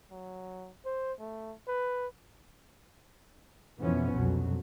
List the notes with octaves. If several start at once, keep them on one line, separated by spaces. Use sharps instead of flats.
F#3
C5
A3
B4
F2 B2 E3 F3 B3 C#4
C2 F2 B2 F#3